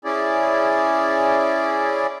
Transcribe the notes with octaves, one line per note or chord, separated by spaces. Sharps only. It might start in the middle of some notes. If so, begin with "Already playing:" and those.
C#4 E4 G#4 D5